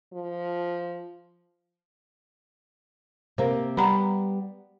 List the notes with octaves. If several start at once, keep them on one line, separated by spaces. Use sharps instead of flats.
F3
C3 A#3 C5
G3 B3 F#5 A#5 B5